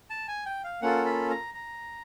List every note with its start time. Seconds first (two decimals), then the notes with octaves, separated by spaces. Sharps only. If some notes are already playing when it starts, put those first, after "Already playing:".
0.10 A5
0.28 G#5
0.46 G5
0.64 F5
0.82 A#3 C#4 F4 A4 F#5
1.06 B5
1.30 A#5
1.54 A#5